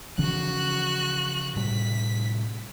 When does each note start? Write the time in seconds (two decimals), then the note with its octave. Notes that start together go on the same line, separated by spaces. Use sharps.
0.18 C#3 E3 F3 F#4 F#6
1.56 A2 C3 G3 B6